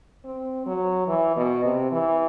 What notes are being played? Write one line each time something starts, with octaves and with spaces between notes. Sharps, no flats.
C4
F#3
E3
B2
C3
E3